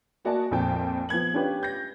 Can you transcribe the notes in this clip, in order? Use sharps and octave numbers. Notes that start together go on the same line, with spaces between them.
A#3 F#4 D5 D#5 G#5 A5
A#1 F2 A#2 G5 A5
F3 B3 G#6 F#7
C#4 D4 F4 G4 B4
G6 A#6